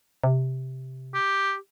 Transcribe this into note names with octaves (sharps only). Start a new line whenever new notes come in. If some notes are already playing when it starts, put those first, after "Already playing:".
C3
G4